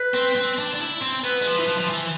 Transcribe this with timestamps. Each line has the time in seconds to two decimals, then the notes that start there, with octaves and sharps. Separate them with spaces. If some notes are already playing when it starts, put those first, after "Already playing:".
Already playing: B4
0.14 C4
0.36 C4
0.58 D4
0.74 D4
0.80 E4
1.01 C4
1.24 B3 B4
1.42 G#3
1.46 F3
1.59 E3
1.68 F3
1.79 F3
1.90 E3